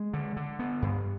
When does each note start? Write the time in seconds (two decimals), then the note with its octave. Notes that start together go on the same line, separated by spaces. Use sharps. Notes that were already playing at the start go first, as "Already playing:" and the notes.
Already playing: G#3
0.14 D3
0.37 D3
0.59 B3
0.82 G2